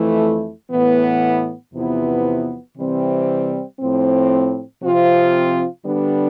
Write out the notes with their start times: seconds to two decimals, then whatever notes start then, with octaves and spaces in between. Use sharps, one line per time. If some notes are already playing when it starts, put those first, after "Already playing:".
Already playing: F2 E3 A3 E4
0.71 A2 E3 B3
1.74 E2 C3 F3 B3 E4
2.77 C3 E3 G3 C4
3.80 A2 F3 C4
4.82 C3 F3 C4 F4
5.85 D3 G3 B3 D4